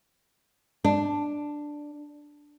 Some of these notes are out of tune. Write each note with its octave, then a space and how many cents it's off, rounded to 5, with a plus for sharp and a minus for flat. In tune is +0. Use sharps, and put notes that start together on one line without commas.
D4 +5